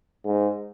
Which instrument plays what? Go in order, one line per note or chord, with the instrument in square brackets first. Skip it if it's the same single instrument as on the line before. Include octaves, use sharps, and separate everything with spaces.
[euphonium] G#2